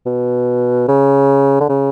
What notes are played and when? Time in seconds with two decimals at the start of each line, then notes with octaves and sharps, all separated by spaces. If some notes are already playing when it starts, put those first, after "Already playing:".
0.06 B2
0.88 C#3
1.61 D3
1.69 C#3